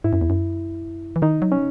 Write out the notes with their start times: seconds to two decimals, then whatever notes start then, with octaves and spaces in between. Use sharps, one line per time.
0.04 G#2 E4
0.13 F#2
0.21 E2
0.30 F#2
1.16 E3
1.22 D#3 D#4
1.42 F#3
1.52 C#4